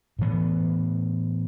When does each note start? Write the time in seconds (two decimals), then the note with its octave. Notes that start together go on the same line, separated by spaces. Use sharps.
0.19 A2 E3 B3